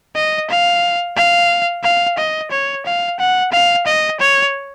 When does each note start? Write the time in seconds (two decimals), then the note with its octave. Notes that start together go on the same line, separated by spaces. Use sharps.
0.15 D#5
0.50 F5
1.17 F5
1.84 F5
2.18 D#5
2.51 C#5
2.86 F5
3.19 F#5
3.52 F5
3.86 D#5
4.20 C#5